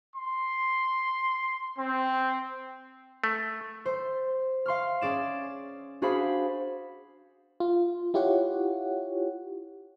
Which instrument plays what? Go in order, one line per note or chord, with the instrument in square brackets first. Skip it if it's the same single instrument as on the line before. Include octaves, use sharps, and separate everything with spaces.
[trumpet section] C6
C4
[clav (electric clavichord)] A3
[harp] C5 C6
F5 C6 C#6 F6
C#4 G#4 D5 E7
D4 F#4 G#4 C5 F5 B5
[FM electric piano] F4
E4 F4 G4 C#5 F#5